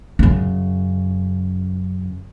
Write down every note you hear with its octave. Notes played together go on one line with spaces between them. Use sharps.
F#2 C#3